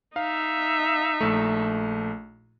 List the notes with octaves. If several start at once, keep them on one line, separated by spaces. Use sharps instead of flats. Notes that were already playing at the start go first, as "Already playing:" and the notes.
D#4 E5 F5
A#1 A3